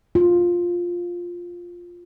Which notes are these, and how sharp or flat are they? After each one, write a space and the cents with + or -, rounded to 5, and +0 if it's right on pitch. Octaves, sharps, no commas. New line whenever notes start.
F4 +5